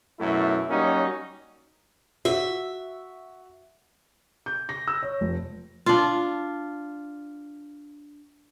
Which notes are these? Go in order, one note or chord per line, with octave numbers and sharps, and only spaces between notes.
F#2 B2 A3 E4
F#3 G3 A#3 C#4 D#4 F#4
F#4 E5
G6
A#6
E6
C#5
F1
D4 F4